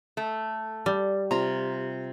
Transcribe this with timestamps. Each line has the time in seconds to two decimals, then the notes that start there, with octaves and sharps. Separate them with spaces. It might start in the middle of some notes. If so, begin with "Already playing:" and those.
0.17 A3
0.86 G3
1.31 C3 F4 A#5